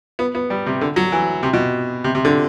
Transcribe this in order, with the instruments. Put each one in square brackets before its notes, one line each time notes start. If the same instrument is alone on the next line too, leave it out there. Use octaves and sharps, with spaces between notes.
[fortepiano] B3
B3
G3
C3
D3
F#3
E3
C3
B2
C3
C3
D3